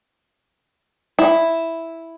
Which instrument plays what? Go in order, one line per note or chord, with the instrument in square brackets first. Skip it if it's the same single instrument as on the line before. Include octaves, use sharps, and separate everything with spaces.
[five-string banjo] E4